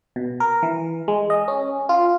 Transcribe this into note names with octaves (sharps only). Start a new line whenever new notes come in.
B2
A#4
E3
G#3
D#5
C#4
F4